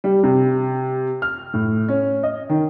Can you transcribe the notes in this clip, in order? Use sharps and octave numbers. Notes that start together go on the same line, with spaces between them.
G3
C3
F6
A2
C#4
D#5
D#3